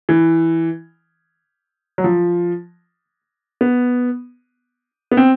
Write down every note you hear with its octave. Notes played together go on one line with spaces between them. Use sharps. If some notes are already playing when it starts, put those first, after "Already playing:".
E3
F#3
F3
B3
B3
C4